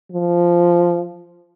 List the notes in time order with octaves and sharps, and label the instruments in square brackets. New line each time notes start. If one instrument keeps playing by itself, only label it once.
[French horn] F3